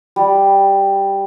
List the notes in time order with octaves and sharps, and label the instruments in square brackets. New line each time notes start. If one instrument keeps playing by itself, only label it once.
[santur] G3